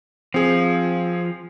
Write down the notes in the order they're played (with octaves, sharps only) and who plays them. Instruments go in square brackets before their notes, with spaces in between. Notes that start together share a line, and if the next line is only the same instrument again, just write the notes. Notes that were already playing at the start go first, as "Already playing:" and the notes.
[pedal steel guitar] F3 [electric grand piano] C4 G#4